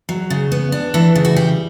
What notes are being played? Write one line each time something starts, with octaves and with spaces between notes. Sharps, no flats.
F#3
C#3
B3
D4
E3 A4
C#3
F#4
G3 G4